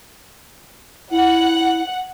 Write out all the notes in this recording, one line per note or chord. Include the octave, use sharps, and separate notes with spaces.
E4 F#5